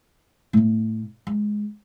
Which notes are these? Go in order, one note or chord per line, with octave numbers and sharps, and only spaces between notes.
A2 B3
G#3